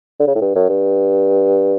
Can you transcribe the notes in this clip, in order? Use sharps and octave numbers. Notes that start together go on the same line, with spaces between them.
D3
C#3
A2
G2
F#2
G2